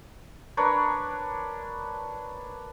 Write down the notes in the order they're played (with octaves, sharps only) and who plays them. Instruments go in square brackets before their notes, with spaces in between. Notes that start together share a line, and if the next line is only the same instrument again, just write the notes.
[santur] D4 A#4 B4 C#5